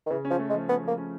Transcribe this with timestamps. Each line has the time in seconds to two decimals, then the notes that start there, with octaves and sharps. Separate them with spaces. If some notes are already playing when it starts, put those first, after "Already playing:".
0.06 D#3
0.10 C#3 E3
0.25 C#4
0.30 F3
0.39 A3
0.49 G#3
0.55 F3
0.69 B3 C#4
0.84 F3 A#3
0.98 C#4